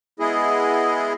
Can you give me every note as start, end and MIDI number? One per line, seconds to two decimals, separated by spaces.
0.20 1.13 56
0.20 1.13 59
0.20 1.13 64
0.20 1.13 68
0.20 1.13 75